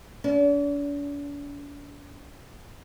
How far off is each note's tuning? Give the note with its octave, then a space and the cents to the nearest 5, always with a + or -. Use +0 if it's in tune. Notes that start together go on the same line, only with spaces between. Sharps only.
D4 -45